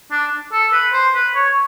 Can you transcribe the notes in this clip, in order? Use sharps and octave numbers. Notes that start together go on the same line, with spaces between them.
D4
A4
B4
C5
B4
C#5